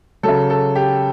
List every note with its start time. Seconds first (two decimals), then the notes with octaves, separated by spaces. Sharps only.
0.23 C#3 F#3 A4
0.50 A4
0.75 G4